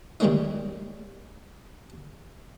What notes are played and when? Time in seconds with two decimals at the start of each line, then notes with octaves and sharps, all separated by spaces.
0.20 D#3 G3 G#3 A#3 C#4 D#4